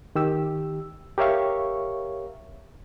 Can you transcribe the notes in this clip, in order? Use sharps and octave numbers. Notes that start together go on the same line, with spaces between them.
D#3 G4 E6
G4 A#4 C#5 E5 F5 C#6